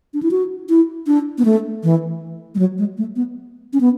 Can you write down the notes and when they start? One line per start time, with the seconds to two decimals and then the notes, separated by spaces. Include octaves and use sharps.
0.14 D4
0.23 E4
0.31 F#4
0.69 E4
1.07 D4
1.38 B3
1.45 A3
1.83 E3
2.55 G#3
2.59 F#3
2.78 G#3
2.98 A3
3.16 B3
3.73 C#4
3.81 B3